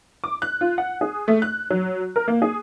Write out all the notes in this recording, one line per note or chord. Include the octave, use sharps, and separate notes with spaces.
D6
F#6
F4
F#5
G#4
A3
F#6
F#3
A#4
A#3
G#4